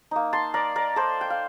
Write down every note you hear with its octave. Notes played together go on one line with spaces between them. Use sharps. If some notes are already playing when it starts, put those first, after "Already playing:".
A#3 D#4
A5 C6
A#4 D5
A#4 D5
A4 C5
G5
F5